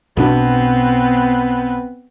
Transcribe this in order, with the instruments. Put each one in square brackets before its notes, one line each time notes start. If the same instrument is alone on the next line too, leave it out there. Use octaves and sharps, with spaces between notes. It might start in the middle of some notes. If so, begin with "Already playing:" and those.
[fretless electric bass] B1 B2 D4 [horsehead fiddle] B3 C4